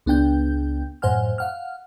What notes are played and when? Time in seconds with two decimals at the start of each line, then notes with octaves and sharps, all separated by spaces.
0.06 C#2 B3 D4 G5 G6
1.02 F#2 A2 C5 F#5 G#5 F6
1.38 F5 F#5 F6